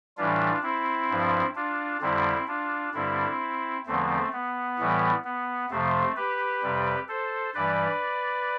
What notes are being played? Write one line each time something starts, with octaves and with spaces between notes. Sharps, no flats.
A2 E3 G3 D4 F4
C4 E4
G2 F3
D4 F4
F2 D3 G3 C4 E4
D4 F4
G2 D3 G3 C4 E4
E2 D3 F3 A3 C4
B3
A2 E3 G3
B3
F2 C3 F3 A3 C4
G4 B4
F2 C3 G3
A4 C5
G2 E3 G3 B4 D5